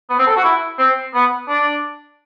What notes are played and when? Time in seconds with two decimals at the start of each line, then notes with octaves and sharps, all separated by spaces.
0.10 B3
0.19 C4
0.27 A4
0.37 F#4
0.44 E4
0.78 C4
1.14 B3
1.49 D4